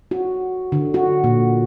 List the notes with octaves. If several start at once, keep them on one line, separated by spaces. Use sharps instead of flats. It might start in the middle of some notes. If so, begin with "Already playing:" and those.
F#4
D3
F#4
A#2